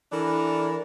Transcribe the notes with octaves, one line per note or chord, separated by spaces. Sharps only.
E3 D4 A4 A#4